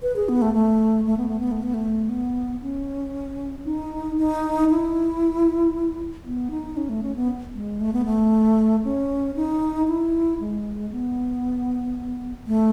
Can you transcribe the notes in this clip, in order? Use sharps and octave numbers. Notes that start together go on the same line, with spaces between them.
B4
G#4
B3
A3
A3
A3
B3
A3
B3
A3
B3
A3
B3
C#4
D#4
D#4
E4
B3
D#4
C#4
A3
C#4
B3
G#3
A3
B3
A3
C#4
D#4
E4
G#3
B3
A3